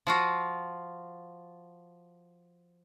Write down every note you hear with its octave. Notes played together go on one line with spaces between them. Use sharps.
F3 F4 F#4